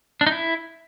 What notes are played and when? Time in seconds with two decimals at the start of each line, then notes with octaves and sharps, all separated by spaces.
0.21 D4
0.27 D#4
0.32 E4